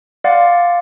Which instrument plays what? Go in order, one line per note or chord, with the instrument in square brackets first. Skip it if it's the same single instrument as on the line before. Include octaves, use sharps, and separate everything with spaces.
[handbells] D5 F5 F#5 C6 A6